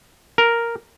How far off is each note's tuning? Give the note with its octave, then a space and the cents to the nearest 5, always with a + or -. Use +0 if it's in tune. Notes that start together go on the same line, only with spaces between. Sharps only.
A#4 +0